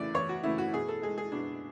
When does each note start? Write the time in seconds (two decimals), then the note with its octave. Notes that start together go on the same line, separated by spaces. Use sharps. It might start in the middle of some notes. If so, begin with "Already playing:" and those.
Already playing: E2 C#3 E3 A3 D5
0.14 E2 C#5
0.29 F#4
0.43 C#3 E3 A3 E4
0.58 F#4
0.74 B2 G#4
0.88 A4
1.02 G#3 G#4
1.18 G#4
1.32 B2 D4